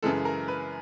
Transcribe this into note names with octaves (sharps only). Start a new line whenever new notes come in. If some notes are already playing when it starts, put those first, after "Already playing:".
F#2 C#3 E3 G#3 A4
A#4
B4